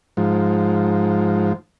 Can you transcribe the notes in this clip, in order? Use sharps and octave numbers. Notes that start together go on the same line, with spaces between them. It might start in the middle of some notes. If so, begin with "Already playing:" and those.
G#2 F3